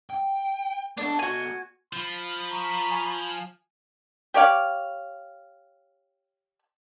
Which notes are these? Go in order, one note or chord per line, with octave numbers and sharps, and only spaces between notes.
G5
B3 D4 A4
F#4 G#5
F3 B5
A#5 C#6
G#5
G4 C#5 D5 F5